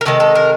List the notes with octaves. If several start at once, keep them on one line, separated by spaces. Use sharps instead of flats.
A#4
C3 D#3 G#3 A4
A4
A#4